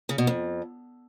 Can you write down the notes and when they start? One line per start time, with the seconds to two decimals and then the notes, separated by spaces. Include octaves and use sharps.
0.09 C#3
0.18 B2
0.27 F2